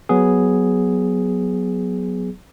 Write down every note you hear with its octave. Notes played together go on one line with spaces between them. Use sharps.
F#3 B3 G#4